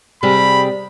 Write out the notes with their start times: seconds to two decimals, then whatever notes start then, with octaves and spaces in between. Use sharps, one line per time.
0.23 C3 G3 G#4 B5